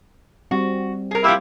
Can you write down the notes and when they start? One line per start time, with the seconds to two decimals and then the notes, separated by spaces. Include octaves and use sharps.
0.51 G3 C4 F#4
1.11 G#4 A#4
1.24 F3 A#3 E4 G4